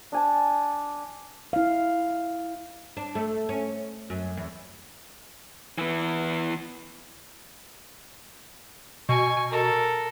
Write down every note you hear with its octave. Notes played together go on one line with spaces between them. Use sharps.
D4 G#5 A5
E4 F5
D4
A3
C#4
F#2
E2
E3 B3
B2 G#5 C#6
A4 A#4